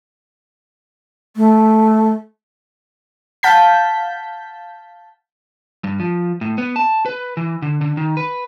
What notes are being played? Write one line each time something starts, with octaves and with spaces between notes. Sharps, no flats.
A3
F5 F#5 A5 G6 B6
G2
F3
A2
B3
A5
B4
E3
D3
D3
D#3
B4